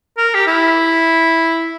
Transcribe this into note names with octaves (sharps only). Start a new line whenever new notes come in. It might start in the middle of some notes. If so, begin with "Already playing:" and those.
A#4
G4
E4